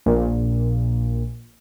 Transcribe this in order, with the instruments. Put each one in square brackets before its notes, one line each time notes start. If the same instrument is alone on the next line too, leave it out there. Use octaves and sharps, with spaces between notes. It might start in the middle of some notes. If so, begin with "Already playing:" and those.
[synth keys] A#1 A#2